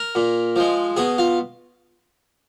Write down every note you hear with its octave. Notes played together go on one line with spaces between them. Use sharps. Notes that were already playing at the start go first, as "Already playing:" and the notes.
Already playing: A#4
A#2
F3 G#3
B2 G#4
F4